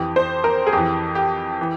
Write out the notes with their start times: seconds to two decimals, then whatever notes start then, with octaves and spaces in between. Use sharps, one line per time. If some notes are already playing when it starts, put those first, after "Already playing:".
Already playing: F2 E3 G4
0.16 C5
0.44 A#4
0.67 G#4
0.73 F2 E3 G4
1.15 G4
1.61 E3